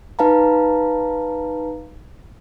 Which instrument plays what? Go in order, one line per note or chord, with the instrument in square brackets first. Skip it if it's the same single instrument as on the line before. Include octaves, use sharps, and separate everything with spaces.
[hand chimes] D#4 B4 F5 A5 A#5